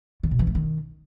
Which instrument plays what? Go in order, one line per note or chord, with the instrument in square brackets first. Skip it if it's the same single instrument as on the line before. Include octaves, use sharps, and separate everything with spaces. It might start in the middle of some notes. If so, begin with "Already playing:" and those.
[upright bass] D#3
B2
E3
A3
D#3